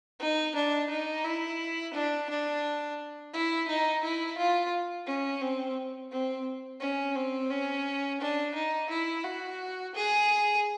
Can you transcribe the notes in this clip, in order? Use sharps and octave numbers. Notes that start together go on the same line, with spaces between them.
D#4
D4
D#4
E4
D4
D4
E4
D#4
E4
F4
C#4
C4
C4
C#4
C4
C#4
D4
D#4
E4
F#4
G#4